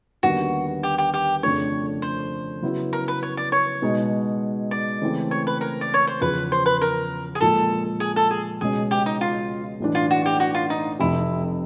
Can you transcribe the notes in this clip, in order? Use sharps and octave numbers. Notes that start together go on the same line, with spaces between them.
D#2 D3 G3 B3 D#4 F#4
G4
G4
G4
F2 C#3 F3 A3 D4 C#5
C5
C#3 F#3 B3 E4
A#4
B4
C#5
D5
C#5
B2 G#3 B3 D#4 G#4
D5
C#3 E3 A3 C4
C#5
B4
A#4
D5
C#5
C5
E2 C#3 F3 B4
C5
B4
A#4
G#4
A#1 A#2 F3 G#3 A4
G#4
A4
G#4
C#2 B2 G#3 C#4 G#4
G4
D#4
F4
B1 A2 E3 A3 D4
F4
F#4
G4
F#4
F4
D#4
F1 F2 C3 E4